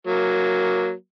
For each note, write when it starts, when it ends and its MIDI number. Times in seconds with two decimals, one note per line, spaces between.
0.07 0.92 54
0.07 0.92 58